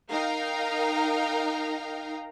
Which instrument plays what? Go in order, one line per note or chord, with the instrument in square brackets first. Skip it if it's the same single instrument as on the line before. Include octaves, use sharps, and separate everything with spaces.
[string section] D#4 A#4 F5 G5 A#5